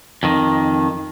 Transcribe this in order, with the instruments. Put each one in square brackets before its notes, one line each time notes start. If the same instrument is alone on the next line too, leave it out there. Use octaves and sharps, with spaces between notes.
[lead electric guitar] F2 D#3